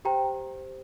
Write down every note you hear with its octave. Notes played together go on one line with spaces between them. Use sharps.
G4 C5 G5 A#5